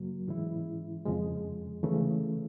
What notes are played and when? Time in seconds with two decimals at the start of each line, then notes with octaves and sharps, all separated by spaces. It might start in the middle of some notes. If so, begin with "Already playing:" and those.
Already playing: F#2 C#3 F#3 A#3
0.27 G#2 E3 G#3 C#4 E4
1.05 F2 C#3 F3 G#3
1.83 C#3 E3 A3